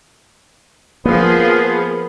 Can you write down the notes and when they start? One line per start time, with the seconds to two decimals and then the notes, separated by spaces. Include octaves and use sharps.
1.05 F3 A#3 B3 G#4